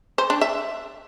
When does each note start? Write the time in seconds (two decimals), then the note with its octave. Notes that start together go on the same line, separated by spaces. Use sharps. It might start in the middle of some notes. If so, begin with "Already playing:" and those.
0.18 C5
0.30 D4
0.41 E5